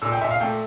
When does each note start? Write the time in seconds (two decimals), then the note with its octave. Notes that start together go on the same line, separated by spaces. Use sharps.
0.02 A#2 E6
0.12 G5
0.21 A#2 E5
0.31 F5
0.40 A3 G5